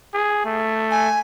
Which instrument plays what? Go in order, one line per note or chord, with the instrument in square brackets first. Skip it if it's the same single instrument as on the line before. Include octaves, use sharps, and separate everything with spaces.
[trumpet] G#4
A3
[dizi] G#5